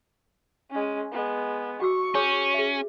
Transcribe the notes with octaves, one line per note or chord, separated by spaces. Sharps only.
G#3 C#4
G#3 B3
F#4 C#6 D6 E6
C#4 G#4 C#5 D6
G#4 E5